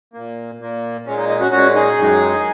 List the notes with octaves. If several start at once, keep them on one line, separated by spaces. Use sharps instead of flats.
A#2 A#3
A#2 A#3
A#2 G#3 C#4
D#4
D#4
C#4 F#4
A#2 C#4 F#4
G#3
D#4 G#4
F#2 D#3 G#3